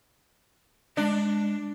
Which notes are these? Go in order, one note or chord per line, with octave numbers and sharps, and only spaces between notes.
G#3 D4